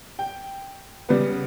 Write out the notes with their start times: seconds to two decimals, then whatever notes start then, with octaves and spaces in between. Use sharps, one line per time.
0.19 G5
1.09 C#3 G3 B3